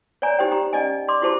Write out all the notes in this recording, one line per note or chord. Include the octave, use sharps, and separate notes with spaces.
C#5 D5 G#5 A#5
D#4 G4 C5 G5
G4 A#5
C#4 D5 D#5 G#5
D5 C6 D6
E4 F#4 G4 C5 A5 D6